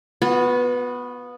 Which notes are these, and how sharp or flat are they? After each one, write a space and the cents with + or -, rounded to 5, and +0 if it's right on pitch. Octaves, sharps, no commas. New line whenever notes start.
B3 +0 F#4 -45